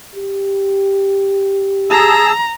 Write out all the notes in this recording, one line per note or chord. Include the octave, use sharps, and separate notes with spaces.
G4
G#4 A5 A#5 E6